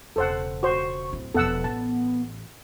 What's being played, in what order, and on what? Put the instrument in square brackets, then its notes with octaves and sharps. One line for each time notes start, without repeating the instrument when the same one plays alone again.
[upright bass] E1 C#3 [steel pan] A4 C5 F#5
[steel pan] F#4 C5 [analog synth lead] C#6
[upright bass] D1 E4
[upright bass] E1 F3 [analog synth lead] B3 [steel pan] A4 F#5 E6
[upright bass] A1 [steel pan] A5